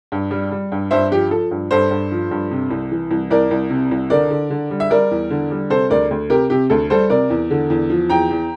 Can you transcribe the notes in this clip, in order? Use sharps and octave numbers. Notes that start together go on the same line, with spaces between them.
G2
G3
G3
G2
G2 C5 E5
F3 G4
F3 A4
G2
G2 A4 C5
G2
F3
G2
C3
C2
E3
C2
C2 A#4 D5
C2
C3
C2
D3 A#4 D5
D3
D3
G3
E5
G3 A#4 D5
E2
D3
G3
C3 A4 C5
D2 A#4 D5
D2
C3 G4 A#4
C3 G4
D2 A4
G3 A4 C5
C3 A#4 D5
E2
D3
E2
F3
E2 G5 A#5
E2